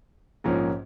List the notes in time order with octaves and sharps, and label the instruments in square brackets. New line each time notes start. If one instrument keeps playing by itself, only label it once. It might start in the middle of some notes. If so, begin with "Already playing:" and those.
[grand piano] A#1 G#2 F3 A#3 C#4